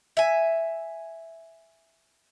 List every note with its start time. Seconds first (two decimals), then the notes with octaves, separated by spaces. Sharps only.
0.17 E5 G#5